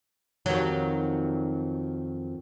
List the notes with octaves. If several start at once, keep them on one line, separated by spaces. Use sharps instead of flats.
F2 D#3 F#3